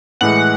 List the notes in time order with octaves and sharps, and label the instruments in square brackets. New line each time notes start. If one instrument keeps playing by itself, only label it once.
[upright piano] A2 E3 G#3 [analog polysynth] F#5